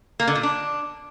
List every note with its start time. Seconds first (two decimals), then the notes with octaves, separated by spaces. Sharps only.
0.20 A#3
0.27 D3
0.35 A#2
0.43 D4